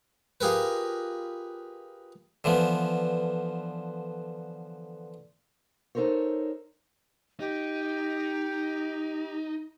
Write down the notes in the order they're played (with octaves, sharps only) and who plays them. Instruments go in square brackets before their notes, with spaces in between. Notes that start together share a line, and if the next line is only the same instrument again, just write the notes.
[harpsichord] F4 G4 G#4 A#4 B4
D3 E3 F3 B3
[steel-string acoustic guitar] D#4 A4 A#4 C5 C#5
[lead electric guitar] D#4 [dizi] G4